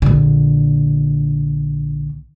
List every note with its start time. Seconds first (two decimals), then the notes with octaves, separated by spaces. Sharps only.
0.02 A#1 D3